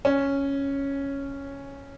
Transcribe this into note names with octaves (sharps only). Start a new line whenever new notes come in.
C#4